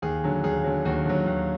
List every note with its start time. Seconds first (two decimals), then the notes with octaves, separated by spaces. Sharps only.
0.02 D#2 G#4
0.24 D3 F#3
0.43 D#2 G#4
0.64 D3 F#3
0.85 D#2 F#4
1.06 D3 F#3
1.26 D#2